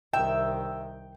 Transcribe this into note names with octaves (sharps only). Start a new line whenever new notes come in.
C2 D#3 E5 G5